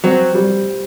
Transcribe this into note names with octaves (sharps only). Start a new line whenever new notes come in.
F#3 C4
G3